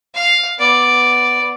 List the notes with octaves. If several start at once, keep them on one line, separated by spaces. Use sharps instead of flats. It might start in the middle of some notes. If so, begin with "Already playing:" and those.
F5
B3 D5